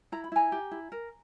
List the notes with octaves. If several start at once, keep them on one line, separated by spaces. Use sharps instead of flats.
E4 A#5
B5
E4 G#5 A#5
G4
E4
A#4